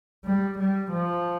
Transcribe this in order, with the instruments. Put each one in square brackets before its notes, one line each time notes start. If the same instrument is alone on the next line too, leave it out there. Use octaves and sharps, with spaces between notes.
[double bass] G3
G3
F3